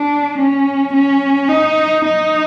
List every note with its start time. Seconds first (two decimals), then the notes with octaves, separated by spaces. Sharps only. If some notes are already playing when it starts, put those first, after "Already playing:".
Already playing: D4
0.38 C#4
0.93 C#4
1.49 D#4
2.04 D#4